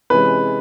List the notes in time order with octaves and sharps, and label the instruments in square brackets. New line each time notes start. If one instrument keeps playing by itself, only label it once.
[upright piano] C3 E3 G#3 C#4 [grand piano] B4